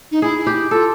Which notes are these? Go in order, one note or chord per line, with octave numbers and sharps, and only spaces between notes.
D#4
E4 G#4
E4
G4
E4
F4 A4